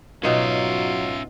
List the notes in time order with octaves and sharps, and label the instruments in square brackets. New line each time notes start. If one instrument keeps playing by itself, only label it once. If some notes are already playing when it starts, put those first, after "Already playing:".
[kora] B2 D#4 C#5 [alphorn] F#3 [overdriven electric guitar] C#4 E5 [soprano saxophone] F4